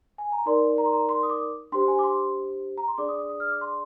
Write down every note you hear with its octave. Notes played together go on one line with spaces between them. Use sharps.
G#5
A#5
D#4 A#4 D5 C6
A#5
C6
A#5
C6
D#6
D6
D4 G4 C5 C6
G#5
D6
C6
A#5
C6
D4 G#4 D5 D6
D#6
D#6
D#6
F6
D6
C6